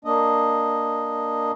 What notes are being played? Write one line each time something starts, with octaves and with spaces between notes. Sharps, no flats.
A#3 D4 D#5